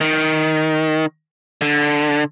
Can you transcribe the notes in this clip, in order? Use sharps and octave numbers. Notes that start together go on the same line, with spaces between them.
D#3
D3